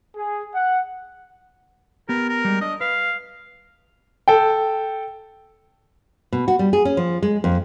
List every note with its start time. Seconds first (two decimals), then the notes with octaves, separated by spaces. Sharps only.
0.15 G#4
0.55 F#5
2.09 B3 G4 A#4
2.29 A#4
2.45 G3 G#3
2.61 D4 D#5
2.81 B4 F5
4.28 A4 G5
6.32 B2
6.48 F#4
6.59 G3
6.73 G#4
6.85 C#4
6.97 F3
7.22 G#3
7.44 F2